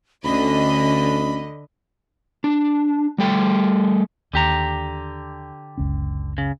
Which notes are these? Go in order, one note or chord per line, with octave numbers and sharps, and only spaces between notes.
D2 D3 C#4 D#5 B5
D4
G3 A3 G5
D#2 D3 G4 A#5
F#1 C#2 C#4
C#3